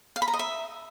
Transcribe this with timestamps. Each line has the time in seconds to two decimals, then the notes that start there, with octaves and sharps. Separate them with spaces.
0.16 F5
0.22 B5
0.28 A#5
0.33 D#5
0.39 E5